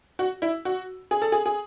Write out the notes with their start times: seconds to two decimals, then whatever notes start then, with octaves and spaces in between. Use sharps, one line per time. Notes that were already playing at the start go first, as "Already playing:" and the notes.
0.19 F#4
0.42 E4
0.65 F#4
1.11 G#4
1.22 A4
1.32 G#4
1.46 G#4